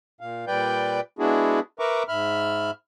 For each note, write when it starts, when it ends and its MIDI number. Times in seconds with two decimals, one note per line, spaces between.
0.21 0.45 46
0.21 0.45 77
0.47 1.00 46
0.47 1.00 55
0.47 1.00 71
0.47 1.00 74
0.47 1.00 79
0.47 1.00 91
1.19 1.60 56
1.19 1.60 59
1.19 1.60 62
1.19 1.60 64
1.19 1.60 66
1.19 1.60 68
1.79 2.03 70
1.79 2.03 71
1.79 2.03 76
1.79 2.03 82
1.79 2.03 85
1.79 2.03 86
2.08 2.71 44
2.08 2.71 76
2.08 2.71 83
2.08 2.71 89